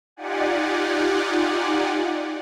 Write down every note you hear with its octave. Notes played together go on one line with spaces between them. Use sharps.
D#4 F4 G4 D5 F#5 G#5